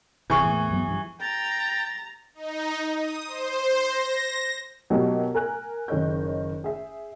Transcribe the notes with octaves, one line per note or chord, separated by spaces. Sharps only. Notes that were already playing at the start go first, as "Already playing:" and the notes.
E1 C2 C3 E3 G#4 C#6
E2 A2 A#3
G2 F#3 B3
G2 D3 F3
G5 A#5 A6
D#4
D#6
C5
A#6
B2 F#3 A#3 D#4 G4
A#4 G#5 F#6
F#1 D#3 C#5 D#5 G6
G#4 E5